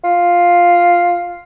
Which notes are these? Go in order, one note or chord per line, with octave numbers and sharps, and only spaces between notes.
F4